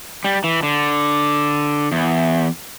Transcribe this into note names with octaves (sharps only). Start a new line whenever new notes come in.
G3
E3
D3
E2